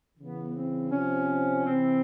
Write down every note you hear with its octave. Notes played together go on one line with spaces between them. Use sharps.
C#3 E3 B3
C4
C3 F3 C#4
C3 E3 C4